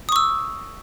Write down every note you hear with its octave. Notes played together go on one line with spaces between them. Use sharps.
C#6 D#6 E6